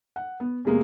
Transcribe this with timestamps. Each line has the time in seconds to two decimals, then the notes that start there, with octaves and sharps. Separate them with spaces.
0.16 F#5
0.40 B3
0.65 E2 C3 G#3 A#3